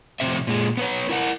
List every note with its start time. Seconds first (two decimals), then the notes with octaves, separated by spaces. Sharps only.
0.20 F2 A2 C3 C4 E5
0.47 A#2 G#3
0.77 B3 B4 C#5
1.09 E4 A#4 F#5